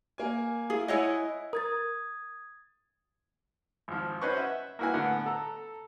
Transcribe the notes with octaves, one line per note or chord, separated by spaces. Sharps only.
A#3 G#5
E4 F4 G#4
E4 C#5 D#5 F#5 G#5 D#6
A#4 D#6 G#6 A6
G#1 F3
C#4 F#4 B4 C5 D#5 C#6
E5 F#5
A#3 E4 F#4 B4 G#5
A2 D3 B3
A4 A#5